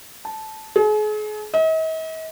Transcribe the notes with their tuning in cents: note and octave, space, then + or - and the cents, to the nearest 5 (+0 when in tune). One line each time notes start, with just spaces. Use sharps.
A5 -10
G#4 +40
D#5 +45